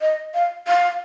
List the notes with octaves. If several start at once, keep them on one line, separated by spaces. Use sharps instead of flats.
D#5
F5
F5